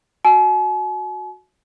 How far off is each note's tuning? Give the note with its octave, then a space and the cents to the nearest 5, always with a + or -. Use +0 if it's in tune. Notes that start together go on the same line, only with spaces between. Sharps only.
F#4 -10 G#5 +45